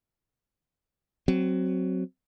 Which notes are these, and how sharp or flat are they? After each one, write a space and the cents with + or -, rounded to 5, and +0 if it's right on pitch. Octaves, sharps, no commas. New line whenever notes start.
F#3 +10 C4 +0